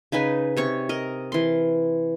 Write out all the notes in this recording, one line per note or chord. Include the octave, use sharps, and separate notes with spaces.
C#3 D#4 B4 G#5
C3 C#5 C#6
A#4 D#5
E3 C6